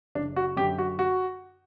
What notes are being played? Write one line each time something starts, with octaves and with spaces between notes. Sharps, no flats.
F#1 D4
F#4
F#2 D3 G4
F#4
F#4